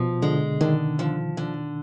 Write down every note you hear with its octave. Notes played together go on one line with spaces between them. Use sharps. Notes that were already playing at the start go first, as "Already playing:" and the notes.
Already playing: B2 F3
D3 G#3
D3 D#3
F3
D3